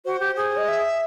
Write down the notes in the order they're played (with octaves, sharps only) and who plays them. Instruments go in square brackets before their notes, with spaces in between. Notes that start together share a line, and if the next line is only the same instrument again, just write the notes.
[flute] F#4 [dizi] C5
[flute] G4
G#4
[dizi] D#5
E5